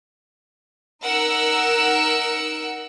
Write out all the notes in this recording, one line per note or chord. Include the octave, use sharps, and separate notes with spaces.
D#4 A#4 F#5 E6